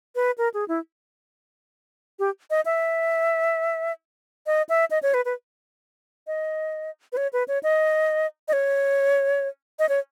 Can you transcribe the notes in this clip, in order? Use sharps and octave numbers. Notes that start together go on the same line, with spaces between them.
B4
A#4
G#4
E4
G4
D#5
E5
D#5
E5
D#5
C#5
B4
B4
D#5
B4
C#5
B4
C#5
D#5
D#5
C#5
D#5
C#5